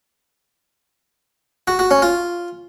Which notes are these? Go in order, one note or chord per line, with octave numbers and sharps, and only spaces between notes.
F#4
F#4
C#4
F4